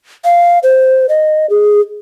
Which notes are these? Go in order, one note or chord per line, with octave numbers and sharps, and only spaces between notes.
F5
C5
D#5
G#4